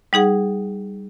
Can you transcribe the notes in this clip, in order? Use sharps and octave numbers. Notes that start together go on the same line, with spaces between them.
G3 D#4 G#4 F#5